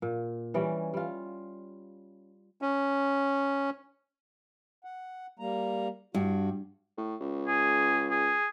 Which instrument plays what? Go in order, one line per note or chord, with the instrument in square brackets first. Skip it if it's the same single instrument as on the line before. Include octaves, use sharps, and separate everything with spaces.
[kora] A#2
E3 G3 C#4 D5
G3 F4
[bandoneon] C#4
[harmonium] F#5
G3 A#3 A#5
[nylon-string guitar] G2 [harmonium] F#4
[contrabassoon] A2
C#2
[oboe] G#4
G#4